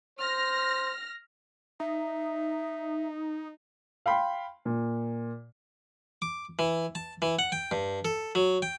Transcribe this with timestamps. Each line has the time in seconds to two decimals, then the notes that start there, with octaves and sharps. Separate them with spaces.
0.19 C5 F6 A#6
1.80 D#4 E5
4.06 F5 G5 B5 C6
4.65 A#2
6.22 D6
6.59 E3
6.95 A5
7.22 E3
7.39 F#5
7.52 G5
7.71 G2
8.05 A4
8.35 F#3
8.62 G5